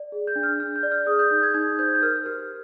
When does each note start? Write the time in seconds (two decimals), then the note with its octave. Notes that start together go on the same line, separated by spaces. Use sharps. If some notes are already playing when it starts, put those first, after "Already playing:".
Already playing: D5
0.12 G#4
0.27 G6
0.36 D4
0.43 F6
0.60 D4 F6
0.76 G6
0.83 D5
0.92 F6
1.06 G#4 D#6
1.19 G6
1.30 D#4 G6
1.43 G#6
1.54 D#4 G#6
1.79 C5 G6
1.95 G6
2.02 A#4 F6
2.26 G4 F6